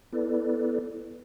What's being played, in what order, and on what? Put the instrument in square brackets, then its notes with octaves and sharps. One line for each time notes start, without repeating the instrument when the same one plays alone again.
[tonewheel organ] B3 E4 A4 B4 D5